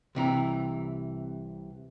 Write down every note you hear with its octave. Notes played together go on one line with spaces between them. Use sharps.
C2 C3 E3 A#5